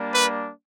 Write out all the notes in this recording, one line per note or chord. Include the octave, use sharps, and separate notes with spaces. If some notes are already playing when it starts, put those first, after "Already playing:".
Already playing: G3 A#3 D4
B4